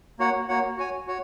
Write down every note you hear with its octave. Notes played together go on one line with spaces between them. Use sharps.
A#3 F#4 C#5 F#5
A#3 F#4 C#5 F#5
F#4 C#5 G#5
F#4 C#5